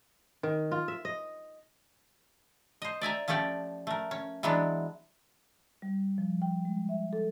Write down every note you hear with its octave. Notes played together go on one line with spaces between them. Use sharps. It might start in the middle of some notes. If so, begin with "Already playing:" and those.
D#3
F4
E5
D#5
C5 D#5
D5 E5 G#5 A#5
F3 A3 C#4 G4 D5
A3 A#4
C#4
E3 F#3 G#3 B3 D4
G3
F3
G5
G#3
E5
A4